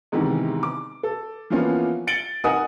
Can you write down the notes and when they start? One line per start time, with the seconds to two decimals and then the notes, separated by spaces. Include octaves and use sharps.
0.12 E2 G#2 C3 D#3 E3
0.63 D6
1.03 A4
1.50 E3 F3 A#3 B3 C#4 F4
2.07 A6 C#7 D7 F#7 G7
2.44 D#4 A#4 D#5 F#5 G#5 D#6